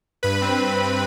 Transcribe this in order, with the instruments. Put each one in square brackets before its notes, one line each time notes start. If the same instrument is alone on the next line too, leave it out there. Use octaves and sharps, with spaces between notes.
[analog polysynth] G2 B4 B5
C4